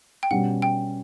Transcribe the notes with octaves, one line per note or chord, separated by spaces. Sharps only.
G5
B2 G3 C#4 F#5
G5